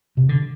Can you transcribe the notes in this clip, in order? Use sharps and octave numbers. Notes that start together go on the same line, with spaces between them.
C3
D3